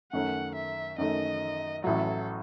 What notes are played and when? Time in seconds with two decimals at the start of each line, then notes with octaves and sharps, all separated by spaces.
0.12 F#2 D#3 A3 C#4 F#5
0.55 E5
0.98 F#2 D#3 A3 C#4 D#5
1.84 A1 A2 F#3 A4